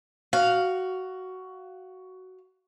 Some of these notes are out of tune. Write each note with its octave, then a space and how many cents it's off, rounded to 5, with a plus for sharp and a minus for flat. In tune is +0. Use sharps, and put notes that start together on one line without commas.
F#4 +10 F5 +0